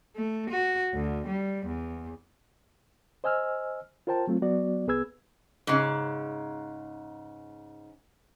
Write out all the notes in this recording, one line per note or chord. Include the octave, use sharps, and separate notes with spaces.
A3
F#4
D2
G3
E2
C5 D#5 G#5 E6 F6
F4 A#4 C5 G5 A5
F#3 A3 C4 F4
F#3 B3 F#4 D5
C2 B3 G#4 B4 E6 G#6
G#2 C#3